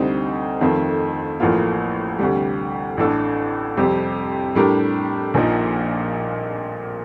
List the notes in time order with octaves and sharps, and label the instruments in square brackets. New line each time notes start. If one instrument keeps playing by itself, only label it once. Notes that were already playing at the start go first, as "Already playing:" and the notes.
Already playing: [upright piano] D2 C3 G3 C4 D#4
F2 D#3 A3 C4 F4
A1 A2 F3 A#3 F4
D2 C3 G3
A1 A2 A3 D4 A4
F2 C3 G3 C4 G4
A2 G3 D4 G4 A#4
A#1 A#2 F3 A#3 D#4